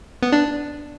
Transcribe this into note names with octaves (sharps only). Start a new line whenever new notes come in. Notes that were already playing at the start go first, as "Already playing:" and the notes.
B3
D4